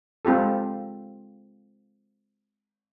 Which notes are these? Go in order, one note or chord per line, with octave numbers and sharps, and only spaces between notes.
G#3 C4 F4 G4 A4